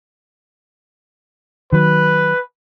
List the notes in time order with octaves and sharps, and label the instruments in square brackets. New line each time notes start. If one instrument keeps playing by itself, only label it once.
[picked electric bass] D#3 F#3 [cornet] B4